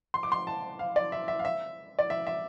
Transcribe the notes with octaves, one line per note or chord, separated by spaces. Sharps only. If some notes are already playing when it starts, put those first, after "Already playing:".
C6
D6
C6
A5
F5
D5
E5
E5
F5
E5
D5
E5
E5